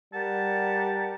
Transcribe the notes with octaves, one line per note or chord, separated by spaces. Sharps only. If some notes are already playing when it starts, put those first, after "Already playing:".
G3 G4 A#4 F#5 A5